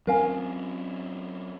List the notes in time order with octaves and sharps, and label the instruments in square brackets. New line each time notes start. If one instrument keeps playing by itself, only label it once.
[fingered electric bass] F#3 C4 C#4 [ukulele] A#4 F5 G#5